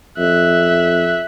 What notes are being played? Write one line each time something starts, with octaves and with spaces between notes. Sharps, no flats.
F2 E5 F#6